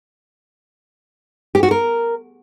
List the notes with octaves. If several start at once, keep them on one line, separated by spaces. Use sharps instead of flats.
G4
F#4
A#4